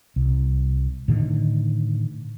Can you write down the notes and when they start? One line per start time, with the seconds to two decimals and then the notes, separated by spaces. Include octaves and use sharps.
0.16 C2
1.08 A2 D3 D#3